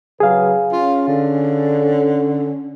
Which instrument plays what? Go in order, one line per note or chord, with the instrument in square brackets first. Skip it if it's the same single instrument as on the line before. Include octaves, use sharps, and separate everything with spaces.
[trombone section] C#3 F#3 B4 [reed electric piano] G#4 F5
[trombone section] C#4 [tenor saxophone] F4
[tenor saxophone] D3